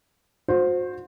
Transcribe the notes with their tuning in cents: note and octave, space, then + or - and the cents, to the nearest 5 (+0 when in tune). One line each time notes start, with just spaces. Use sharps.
F#4 -35 C5 +0